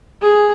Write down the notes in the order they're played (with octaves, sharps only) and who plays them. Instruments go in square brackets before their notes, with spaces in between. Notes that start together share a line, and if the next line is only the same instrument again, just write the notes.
[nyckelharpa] G#4